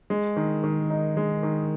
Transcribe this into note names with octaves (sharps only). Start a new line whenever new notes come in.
G#3
D#3
D#3
D#4
G#3
D#3